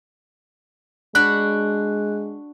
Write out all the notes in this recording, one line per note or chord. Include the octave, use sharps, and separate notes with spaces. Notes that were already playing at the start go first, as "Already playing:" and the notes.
G#3 D4 F#4 B5 F#6